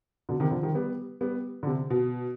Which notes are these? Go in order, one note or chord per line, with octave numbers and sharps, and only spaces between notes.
B2 D3
C3 D#3
D3 F3
D#3 G3
G3 B3
G3 B3
D3
C3
B2